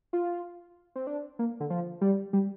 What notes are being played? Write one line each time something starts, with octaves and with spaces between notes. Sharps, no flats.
F4
C4
D4
A#3
D3
F3
G3
G3